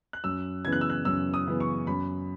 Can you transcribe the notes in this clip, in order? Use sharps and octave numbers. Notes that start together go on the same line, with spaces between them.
F#6
F#2 E6
C#3 E3 B3 G#6
F#6
E6
F#6
F#2 E6
D#6
C#3 E3 B3
C#6
F#2 B5